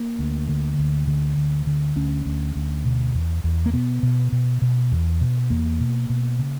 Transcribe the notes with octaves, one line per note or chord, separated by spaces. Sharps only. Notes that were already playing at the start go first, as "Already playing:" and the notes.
Already playing: A#3
D2
D3
D2
D3
D2
D3
D2 C#4
D2
D2
B2
E2
E2
A#3
B2 B3
B2
B2
B2
E2
B2
E2 A#3
B2
B2
C#3